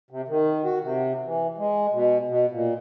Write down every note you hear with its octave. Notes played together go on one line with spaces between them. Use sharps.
C3
D#3
F#4
C3
E3
G#3
B2
B2
A#2